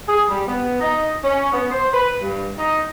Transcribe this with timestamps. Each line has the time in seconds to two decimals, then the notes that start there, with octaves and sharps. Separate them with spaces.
0.08 G#4
0.29 G3
0.46 B3
0.80 D#4
1.23 C#4
1.52 B3
1.72 C5
1.92 B4
2.21 G2
2.58 D#4